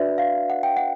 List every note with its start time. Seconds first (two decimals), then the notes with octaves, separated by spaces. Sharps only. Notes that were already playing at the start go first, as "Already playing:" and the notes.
Already playing: D4 F#4 B4 D5 E5
0.18 F5
0.50 F#5
0.63 G5
0.77 F#5